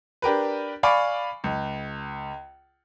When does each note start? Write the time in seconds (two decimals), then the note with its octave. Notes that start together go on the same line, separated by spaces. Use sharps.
0.22 D4 G4 A#4 B4
0.83 D5 F5 G#5 B5 C#6 D6
1.44 C#2